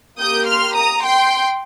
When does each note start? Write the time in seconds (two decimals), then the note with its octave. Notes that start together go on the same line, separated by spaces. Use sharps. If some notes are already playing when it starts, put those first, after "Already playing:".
0.19 A#3 G4 D#6 G6
0.46 C6 F6
0.75 A#5 D#6
1.03 G5 C6